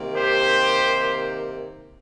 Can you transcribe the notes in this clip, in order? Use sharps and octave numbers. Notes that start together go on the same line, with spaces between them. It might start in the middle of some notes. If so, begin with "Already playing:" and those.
Already playing: C3 D#3 A#3
G4 C5